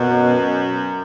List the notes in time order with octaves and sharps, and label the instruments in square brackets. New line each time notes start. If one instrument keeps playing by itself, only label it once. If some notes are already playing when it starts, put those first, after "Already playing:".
Already playing: [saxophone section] F#2 [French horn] B2